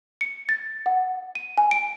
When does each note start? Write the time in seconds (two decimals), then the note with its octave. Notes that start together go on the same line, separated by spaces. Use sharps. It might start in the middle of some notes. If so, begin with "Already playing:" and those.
0.21 C#7
0.49 A6
0.86 F#5
1.35 D#7
1.58 G#5
1.71 D7